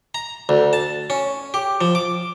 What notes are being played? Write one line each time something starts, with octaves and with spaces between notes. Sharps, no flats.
A#5
D2
A5
C#4
G4
F3
D6